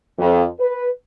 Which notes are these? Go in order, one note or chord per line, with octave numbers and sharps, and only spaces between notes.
F2
B4